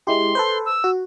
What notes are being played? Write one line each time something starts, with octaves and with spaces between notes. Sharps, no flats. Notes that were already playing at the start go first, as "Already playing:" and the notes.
G#3 E4 G4 C6
A4 B4 C5
E6
F#4